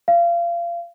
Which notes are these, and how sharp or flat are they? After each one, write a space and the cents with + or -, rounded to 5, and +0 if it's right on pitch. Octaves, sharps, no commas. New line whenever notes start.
F5 -30